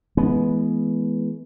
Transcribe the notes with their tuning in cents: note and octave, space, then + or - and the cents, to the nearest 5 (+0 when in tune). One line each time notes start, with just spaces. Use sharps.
E3 +0 G#3 +30 B3 +0